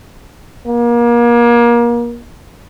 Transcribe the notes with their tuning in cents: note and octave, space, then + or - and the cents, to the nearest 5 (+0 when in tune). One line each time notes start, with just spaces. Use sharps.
A#3 +30